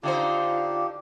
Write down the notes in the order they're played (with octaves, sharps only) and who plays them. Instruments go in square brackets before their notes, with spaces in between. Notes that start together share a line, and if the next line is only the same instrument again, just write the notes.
[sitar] D3 D#4 C5 [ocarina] F4 [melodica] G4 [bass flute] F5